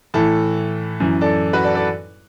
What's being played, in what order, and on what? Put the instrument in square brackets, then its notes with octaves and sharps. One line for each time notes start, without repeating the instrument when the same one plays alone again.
[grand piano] A2 E3 A4
F#2 E3
A4 D5
F#4 B4
A4 D5
A4 D5